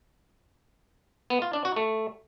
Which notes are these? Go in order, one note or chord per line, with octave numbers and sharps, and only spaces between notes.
B3
F4
D4
F#4
A3